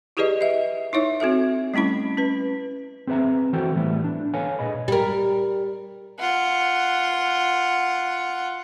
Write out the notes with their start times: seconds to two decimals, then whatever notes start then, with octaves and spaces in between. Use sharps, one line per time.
0.17 E4 G4 G#4 B4 D5 D#5
0.41 D#5 E5
0.93 D#4 E4 C#5 E5
1.20 C4 F#4 A4 E5
1.74 G3 A3 C#4 E4 B5
2.17 C#4 B4
3.07 C4 G#4 B4 E5 A#5
3.53 E3 F#4 A4 C5 G5
3.75 A2 E3 G3 A3 B3 E4
4.04 D4
4.34 A4 B4 C#5 F5 G#5
4.59 A#2 G#4 D#5 B5
4.88 G3 A#4
6.19 F4 F#5